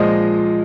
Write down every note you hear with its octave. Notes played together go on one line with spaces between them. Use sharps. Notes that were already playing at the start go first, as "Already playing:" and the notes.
Already playing: A#2 F3 G#3 D#5